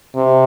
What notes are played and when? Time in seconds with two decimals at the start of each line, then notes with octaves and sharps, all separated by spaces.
0.15 C3